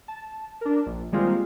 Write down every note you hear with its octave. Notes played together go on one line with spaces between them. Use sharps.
A5
D4 A#4
A#1
D#3 G3 G#3 A#3 C4 F4